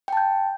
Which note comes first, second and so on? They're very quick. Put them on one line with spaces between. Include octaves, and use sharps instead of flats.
G5 A5 G6